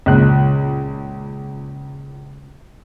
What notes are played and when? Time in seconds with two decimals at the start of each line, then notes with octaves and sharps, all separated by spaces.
0.06 C#2 A#2 F#6